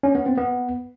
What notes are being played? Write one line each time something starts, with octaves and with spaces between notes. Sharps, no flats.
C#4
B3
C4
B3